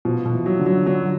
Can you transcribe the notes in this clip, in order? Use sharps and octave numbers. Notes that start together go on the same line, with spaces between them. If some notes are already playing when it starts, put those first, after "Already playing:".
B2 F3
B2
E3
F#3
D3
F#3
D3 F#3